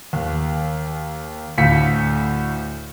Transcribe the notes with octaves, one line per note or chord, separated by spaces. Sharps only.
D#2
D2 A2 F5 B6 C#7